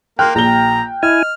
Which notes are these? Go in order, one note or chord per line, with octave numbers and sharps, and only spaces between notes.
A#3 G5 C6 F6 F#6
A#1 A#5 G7
E4 D#5 G#5 F6